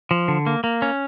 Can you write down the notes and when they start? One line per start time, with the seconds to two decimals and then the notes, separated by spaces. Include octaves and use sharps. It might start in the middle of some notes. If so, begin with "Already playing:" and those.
0.11 F3
0.28 D3
0.47 A#3
0.64 A#3
0.82 C#4